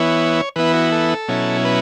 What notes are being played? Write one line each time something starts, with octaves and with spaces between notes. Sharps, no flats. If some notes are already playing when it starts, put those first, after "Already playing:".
Already playing: E3 B3 E4 C#5
E3 B3 E4 B4
F#4
A4
B2 F#3 C#4 E4
B4